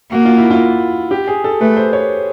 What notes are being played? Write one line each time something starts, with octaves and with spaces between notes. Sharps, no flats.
A#3 F#4
F4
E4
F4
G4
G#4
A4
A3 B4
C5
C#5